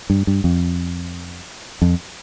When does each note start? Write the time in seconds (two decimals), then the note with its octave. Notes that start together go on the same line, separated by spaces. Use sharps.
0.10 G2
0.27 G2
0.44 F2
1.82 F2